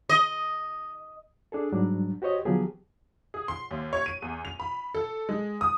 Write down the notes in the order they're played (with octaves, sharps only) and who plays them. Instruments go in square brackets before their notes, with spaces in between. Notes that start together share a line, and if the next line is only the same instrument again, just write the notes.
[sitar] D#5
[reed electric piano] D4 G#4 A4
G#2 F#3 G3 D4
F#4 G4 C5 C#5 D#5
D3 F3 F#3 B3 G4 G#4
[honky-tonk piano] G#4
C6
D#2
C#5
D#7
E2
F7
B5
A4
G#3
D#6